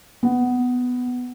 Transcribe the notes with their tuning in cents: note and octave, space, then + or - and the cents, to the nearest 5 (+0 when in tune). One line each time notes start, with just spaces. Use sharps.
B3 +10